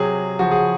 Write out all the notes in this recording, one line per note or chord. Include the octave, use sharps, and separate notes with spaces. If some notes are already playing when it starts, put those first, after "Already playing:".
Already playing: C3 F#3 G#4
C#3 F3 F#4
G#4